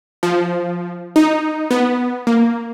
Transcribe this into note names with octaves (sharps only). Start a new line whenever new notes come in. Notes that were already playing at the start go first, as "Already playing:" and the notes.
F3
D#4
B3
A#3